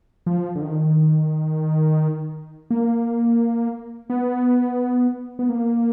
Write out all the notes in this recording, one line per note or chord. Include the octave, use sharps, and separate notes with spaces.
F3
D3
D#3
A#3
B3
B3
A#3